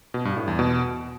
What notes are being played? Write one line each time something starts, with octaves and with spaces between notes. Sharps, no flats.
B2
G2
A2
E2
B2